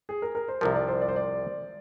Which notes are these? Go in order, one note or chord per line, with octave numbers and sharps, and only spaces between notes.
G#4
A#4
A#4
C5
C2 C3 F3 A#4
D5
C5
D5
C5
D5